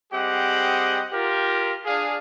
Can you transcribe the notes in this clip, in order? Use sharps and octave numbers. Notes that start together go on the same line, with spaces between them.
G3 C4 G4 G#4 D#5 F#5
F4 G4 A#4
D4 G#4 F5